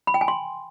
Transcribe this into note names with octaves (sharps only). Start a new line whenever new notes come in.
B5
G5
G#5
C6